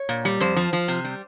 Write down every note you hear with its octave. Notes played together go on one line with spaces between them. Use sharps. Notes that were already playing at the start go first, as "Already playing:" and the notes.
Already playing: C#5
A#2
G3
F2 C5
F3
F3
C3
G3